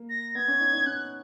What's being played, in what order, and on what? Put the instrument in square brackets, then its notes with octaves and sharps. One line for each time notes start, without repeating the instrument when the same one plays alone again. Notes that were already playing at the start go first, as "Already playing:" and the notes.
Already playing: [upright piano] A#3
[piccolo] A#6
[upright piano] B3 [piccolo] G#6
[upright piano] C#4
D#4
D#4
[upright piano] C#4 [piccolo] F#6